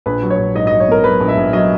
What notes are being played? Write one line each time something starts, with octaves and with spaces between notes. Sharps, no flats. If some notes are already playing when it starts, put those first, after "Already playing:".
A#1 B4
F#3
C#5
A#1
G#2 D#5
F#3 D#5
C#5
B3 A#4
F#3 B4
A#1
E5
A#1
F#3 D#5